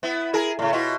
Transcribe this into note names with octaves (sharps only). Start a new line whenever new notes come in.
B3 E4
E4 G#4 A#4
A2 C#3
B2 E4 F4